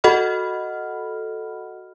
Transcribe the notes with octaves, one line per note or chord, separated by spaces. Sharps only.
F#4 A4 D#5 F#5 B5 F6